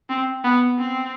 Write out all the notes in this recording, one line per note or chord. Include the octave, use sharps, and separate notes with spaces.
C4
B3
C4